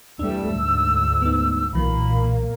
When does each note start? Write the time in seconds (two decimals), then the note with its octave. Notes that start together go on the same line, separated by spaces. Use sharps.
0.19 E2 G3 A3 D4 E6
0.53 D2 G#2
1.22 B3 D#4
1.73 B1 A#2 E3 F#3 A#3 B5